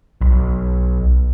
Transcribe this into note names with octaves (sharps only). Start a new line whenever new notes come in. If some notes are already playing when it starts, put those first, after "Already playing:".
B1